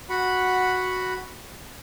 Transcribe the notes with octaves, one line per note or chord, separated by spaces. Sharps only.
F#4 F#5 B5